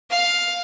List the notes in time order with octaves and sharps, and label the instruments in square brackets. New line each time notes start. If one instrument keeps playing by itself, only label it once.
[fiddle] F5